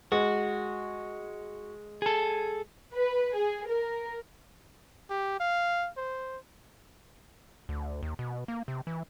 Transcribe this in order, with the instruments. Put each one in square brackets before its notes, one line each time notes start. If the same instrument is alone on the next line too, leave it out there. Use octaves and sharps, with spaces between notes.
[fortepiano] G#3 [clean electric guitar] F#4
[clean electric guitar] G#4 A4
[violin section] B4
G#4
A#4
[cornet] G4
F5
C5
[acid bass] D2
D#2
B2
A#3
C3
E3